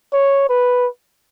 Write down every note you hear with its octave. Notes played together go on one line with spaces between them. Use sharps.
C#5
B4